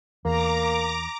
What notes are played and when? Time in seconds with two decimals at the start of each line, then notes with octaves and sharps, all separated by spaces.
0.25 E2 A#3 A#5 D6